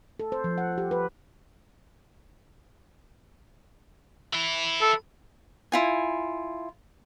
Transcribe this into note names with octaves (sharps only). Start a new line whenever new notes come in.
A4
C5
F3
F#5
G4
B4
E3 E4
A4
E4 F4 G#5